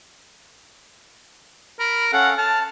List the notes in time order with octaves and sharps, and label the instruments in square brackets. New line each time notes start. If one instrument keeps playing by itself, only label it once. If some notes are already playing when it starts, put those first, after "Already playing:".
[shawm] A#4 [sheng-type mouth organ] B5
[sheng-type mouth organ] C#4 A4 F5 [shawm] F#5
[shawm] A5 [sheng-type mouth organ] F6